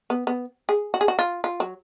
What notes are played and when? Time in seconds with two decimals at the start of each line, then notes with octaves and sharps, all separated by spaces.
0.10 B3
0.27 B3
0.69 G#4
0.94 F#4
1.01 G#4
1.08 F#4
1.19 F4
1.44 F4
1.60 F#3